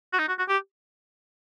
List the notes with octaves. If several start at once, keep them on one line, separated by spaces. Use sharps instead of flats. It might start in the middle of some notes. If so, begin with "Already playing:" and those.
F#4
D#4
F#4
F#4
G4